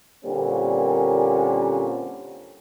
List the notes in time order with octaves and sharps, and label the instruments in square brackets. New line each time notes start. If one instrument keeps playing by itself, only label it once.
[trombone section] A#2 D3 G3 A#3 C4 C#4